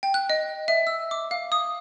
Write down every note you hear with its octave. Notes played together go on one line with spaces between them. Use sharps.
G5
F#6
D#5
E5
E6
D6
F5
D#6